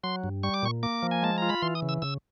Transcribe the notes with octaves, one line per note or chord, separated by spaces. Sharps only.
F#3 C6
G2
G3 C#6
D6
A#2 C#6
A#3 D6
F3
G#5
G#3 A5
F4 A#5
B5
E3 C6
D#6
C#3
E6
C#3 E6